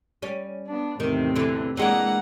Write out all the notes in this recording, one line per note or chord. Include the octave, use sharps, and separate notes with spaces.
G3 C#4
B3 D4
E2 A2 C3 D#3
D3 E3
E3 G#3 A#3 D4 F#5 A#5